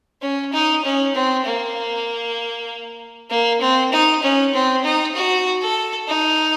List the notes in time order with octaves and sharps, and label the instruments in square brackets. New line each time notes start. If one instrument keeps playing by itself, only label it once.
[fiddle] C#4
D#4
C#4
C4
A#3
A#3
C4
D#4
C#4
C4
D#4
F#4
A4
D#4